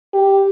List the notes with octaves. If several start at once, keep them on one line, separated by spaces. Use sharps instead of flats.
G4